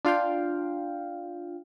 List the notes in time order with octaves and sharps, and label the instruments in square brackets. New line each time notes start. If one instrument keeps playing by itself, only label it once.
[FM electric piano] D4 F4 F5 G5